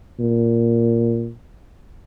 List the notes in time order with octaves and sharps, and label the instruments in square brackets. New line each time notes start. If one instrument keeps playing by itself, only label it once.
[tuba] A#2